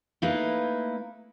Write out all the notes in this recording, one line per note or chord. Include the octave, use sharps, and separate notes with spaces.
A3 A#3 D#4 E4 B4 F5